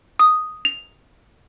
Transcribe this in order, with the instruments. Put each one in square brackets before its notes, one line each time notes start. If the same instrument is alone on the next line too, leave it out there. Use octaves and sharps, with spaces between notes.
[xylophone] D#6
F7